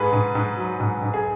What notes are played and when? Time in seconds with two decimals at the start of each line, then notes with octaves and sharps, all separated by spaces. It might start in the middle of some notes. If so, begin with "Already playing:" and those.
Already playing: G#2 G#4 B4
0.13 G#2
0.35 G#2
0.57 F#3
0.80 G#2
1.02 G#2
1.14 G#4